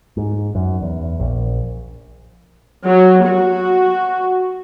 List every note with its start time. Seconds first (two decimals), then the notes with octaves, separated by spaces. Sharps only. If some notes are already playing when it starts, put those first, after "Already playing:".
0.17 G#2
0.55 F#2
0.81 E2
1.20 A#1
2.87 F#3
3.27 F#4